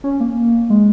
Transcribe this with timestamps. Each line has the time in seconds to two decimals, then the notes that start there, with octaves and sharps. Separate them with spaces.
0.04 C#4
0.20 A#3
0.70 G#3